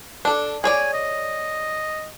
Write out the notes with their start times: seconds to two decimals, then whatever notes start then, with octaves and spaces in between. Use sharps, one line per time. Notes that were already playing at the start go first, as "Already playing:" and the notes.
0.25 D4 A4
0.64 G#4 C#5 D5 G#5
0.93 D#5